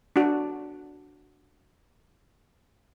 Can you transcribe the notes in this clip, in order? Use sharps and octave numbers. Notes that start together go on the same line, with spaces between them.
D4 F#4